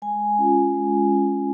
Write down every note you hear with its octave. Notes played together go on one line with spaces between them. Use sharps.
G#3 G#5
C#4 F4
G#3
C#4 F4